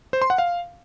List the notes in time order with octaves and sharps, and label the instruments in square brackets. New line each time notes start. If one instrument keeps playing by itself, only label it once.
[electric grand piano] C5
C6
F#5
F5